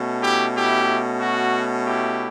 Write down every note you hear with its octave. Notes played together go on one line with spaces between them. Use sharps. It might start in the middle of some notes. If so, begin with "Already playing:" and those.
Already playing: B2 A3 C#4
E4 G4
E4 G4
F#4
E4 G4